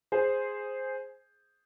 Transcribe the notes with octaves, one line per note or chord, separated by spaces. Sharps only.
G#4 C5